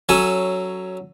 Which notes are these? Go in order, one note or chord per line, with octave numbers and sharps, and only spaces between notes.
F#3 C#4 A4 G#5